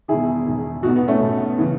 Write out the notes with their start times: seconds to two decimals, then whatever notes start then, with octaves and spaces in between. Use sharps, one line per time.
0.08 E1 E2 D#3 E4 G#4
0.46 E1 E2 D#3
0.83 B1 B2 D#4 F#4
0.96 B3 D#4
1.08 A3 C#4
1.21 B1 B2
1.58 C#3 E3